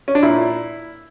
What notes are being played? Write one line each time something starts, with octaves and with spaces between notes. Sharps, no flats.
C#4
D4
A#2 E4